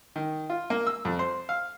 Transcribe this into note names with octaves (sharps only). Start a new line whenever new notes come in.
D#3
F4
A#3
E6
F2
C5
F5